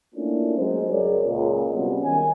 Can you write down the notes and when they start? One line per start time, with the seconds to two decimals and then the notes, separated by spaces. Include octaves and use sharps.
0.15 A3 A#3 C#4 D4 E4 F4
0.58 F#3 G#3 C5
0.90 C#2 F#2 G#4 A#4 C#5 D5
1.26 C#2 A#2
1.71 C3 F#3 G3 B3 C#4
2.03 D#3 G#5